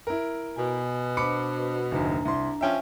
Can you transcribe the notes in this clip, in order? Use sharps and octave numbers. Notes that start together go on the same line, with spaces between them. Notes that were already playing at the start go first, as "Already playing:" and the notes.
E4 A#4
B2 G#5
D4 C5 A5 B5 D6 C#7
F#1 D#2 D4 A#5
C2 C6
F3 C#4 E5 G5 G#5